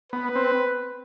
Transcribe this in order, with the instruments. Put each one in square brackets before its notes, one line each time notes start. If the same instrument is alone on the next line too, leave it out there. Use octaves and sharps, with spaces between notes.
[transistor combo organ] B3 [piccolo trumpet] B4
[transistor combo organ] C4